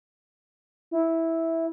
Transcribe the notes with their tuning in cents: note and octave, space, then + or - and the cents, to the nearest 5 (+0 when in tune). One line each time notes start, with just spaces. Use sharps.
E4 -10